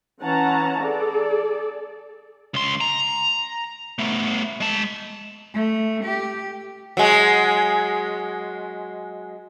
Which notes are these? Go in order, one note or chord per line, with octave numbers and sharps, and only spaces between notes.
E3 C#4 F#5 A5 A#5
G#4 A4 D5
C#2 C6
A#5
A3 B3
G#3 A5
A3
G4
F#3 G#3